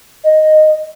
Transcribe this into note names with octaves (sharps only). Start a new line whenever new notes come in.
D#5